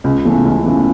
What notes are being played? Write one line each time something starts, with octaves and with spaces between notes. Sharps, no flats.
C#2
C#3 E3 A3
C#2
C#3 E3 A3